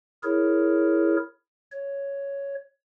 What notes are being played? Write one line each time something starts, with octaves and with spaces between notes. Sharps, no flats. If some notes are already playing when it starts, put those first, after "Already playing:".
E4 G#4 A#4 C#5
C#5